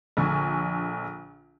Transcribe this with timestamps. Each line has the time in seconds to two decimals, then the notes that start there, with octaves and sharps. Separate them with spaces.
0.17 A#1 D3 G#5 C#6